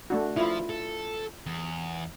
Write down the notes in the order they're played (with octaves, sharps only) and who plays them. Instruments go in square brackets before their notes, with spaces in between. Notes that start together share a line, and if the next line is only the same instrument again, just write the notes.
[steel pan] A3 D4 F#4
[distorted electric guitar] F3 [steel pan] E4 F4
[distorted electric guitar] A4
E2